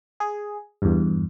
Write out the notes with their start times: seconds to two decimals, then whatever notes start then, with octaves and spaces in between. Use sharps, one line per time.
0.20 G#4
0.82 E2 G2